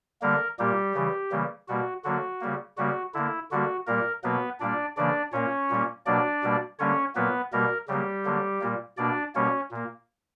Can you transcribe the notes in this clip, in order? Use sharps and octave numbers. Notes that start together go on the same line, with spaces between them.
D3 G3 A#3 A#4
A#2 G3 A#3 G4
C#3 E3 G3
C#3 E3 G3 A#3
B2 G3 A#3 F#4
D3 F#3 A#3 F#4
C#3 G3 A#3
C#3 G3 A#3 F#4
D3 A#3 E4
D3 G3 A#3 F#4
A#2 G3 A#3 A#4
B2 F#3 A#3 B3 B4
A#2 G3 A#3 D4 D5
C#3 E3 A#3 D4 D5
A#2 A#3 C#4 C#5
A#2 G3 A#3
B2 F#3 A#3 D4 D5
B2 G3 A#3
D3 G3 A#3 C#4 C#5
A#2 F#3 A#3 B3 B4
B2 G3 A#3 A#4
C#3 F#3 G3 A#3 G4
D3 F#3 A#3
A#2 G3 A#3
B2 A#3 D4 D5
B2 G3 A#3 C#4 C#5
A#2 A#3